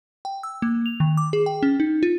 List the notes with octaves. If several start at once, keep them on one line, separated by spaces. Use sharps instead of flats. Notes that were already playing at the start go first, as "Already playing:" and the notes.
G5
E6
A#3
F7
D#3
D6
G#4
G5
C#4
D#4
F4